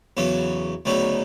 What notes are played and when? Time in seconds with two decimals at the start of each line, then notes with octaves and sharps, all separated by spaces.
0.17 E2 C#3 F#3 B3
0.85 D2 C#3 F#3 B3 D#4